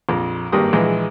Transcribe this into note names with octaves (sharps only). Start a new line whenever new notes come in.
A#1 F2
G#1 G2 G3 A#3 G4 D#6
A#1 E3 G#3